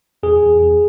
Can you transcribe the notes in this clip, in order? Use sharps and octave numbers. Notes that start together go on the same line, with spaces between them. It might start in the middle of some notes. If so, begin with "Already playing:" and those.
E2 G#4
E2
E2